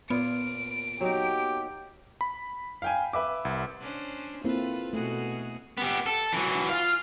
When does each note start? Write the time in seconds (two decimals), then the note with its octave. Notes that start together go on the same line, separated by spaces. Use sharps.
0.10 A#2 B3 F4 D5 D7
1.01 F#3 D#4 G4
2.21 B5
2.82 F5 G5 G#5
3.13 B4 E5 D6
3.45 C2
3.81 C#4 D4 C5
4.44 A#3 C4 E4 F4 A4 B4
4.93 B2 A3 F#4 G#4
5.78 B3 G4
6.06 A4
6.33 E3 F#3
6.69 F4 F5